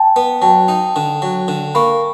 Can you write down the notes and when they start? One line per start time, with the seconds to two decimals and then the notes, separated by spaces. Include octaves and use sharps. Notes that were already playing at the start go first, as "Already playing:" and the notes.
Already playing: G5 A5
0.16 B3
0.42 F#3 G5 A5
0.68 D#4
0.96 D3
1.22 F#3
1.48 D3
1.75 A#3 B5 C#6